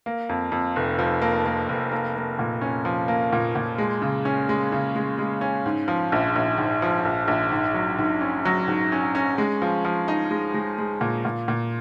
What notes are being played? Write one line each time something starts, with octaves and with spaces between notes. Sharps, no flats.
A#3
F2
F2
F1
F3
A#3
A#3
F1
A#3
A#3
A#2
C#4
F3
A#3
A#2
A#2
G#3
C#3
C#4
G#3
C#3
G#3
G#3
C#4
G#2
F3
A#1
A#1
G#2
F3
A#1
A#1
G#2
F#3
G#2
C#4
F#3
G#2
C#4
C#4
G#3
F3
F3
D#4
G#3
G#3
G#3
A#2
A#2
A#2